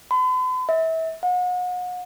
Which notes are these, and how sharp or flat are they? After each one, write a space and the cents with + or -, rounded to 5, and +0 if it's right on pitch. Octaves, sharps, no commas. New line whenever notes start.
B5 +45
E5 -30
F#5 -40